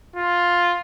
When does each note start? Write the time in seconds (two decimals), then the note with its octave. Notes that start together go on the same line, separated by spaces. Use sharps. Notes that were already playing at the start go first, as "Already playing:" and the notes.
0.16 F4